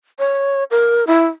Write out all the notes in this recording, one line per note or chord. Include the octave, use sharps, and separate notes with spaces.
C#5
A#4
E4